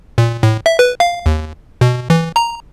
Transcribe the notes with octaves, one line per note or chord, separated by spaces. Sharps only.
A#2
A2
E5
B4
F5
D#2
B2
E3
A#5